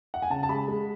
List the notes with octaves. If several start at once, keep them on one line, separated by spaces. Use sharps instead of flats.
F#5
G#5
C#3 A5
A5
G#3 B5
G#3